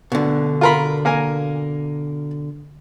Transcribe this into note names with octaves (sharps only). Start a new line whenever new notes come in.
B2 D3
F4 A#4 B5
A#3 A#4 G#5